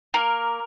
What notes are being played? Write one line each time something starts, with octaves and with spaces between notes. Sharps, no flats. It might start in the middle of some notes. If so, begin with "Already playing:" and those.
A#3 A#4